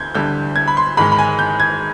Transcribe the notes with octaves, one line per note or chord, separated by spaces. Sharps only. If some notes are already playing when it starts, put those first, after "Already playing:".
Already playing: D2 D3 G6 G#6
D2 D3 G3 G6
G#6
B5
C6
G#2 D#3 G#3 B5
B5
G#5
G6
G#6